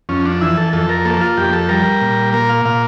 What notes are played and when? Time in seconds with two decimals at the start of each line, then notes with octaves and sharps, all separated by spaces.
0.09 F2 C#4
0.25 D4
0.41 E3 E4
0.57 A4
0.73 F2 A4
0.89 A#4
1.05 A#3 A4
1.21 F4
1.37 F2 G4
1.53 A4
1.69 G3 A#4
2.01 A#2
2.33 A#3 A#4
2.49 F5
2.65 A#2 F5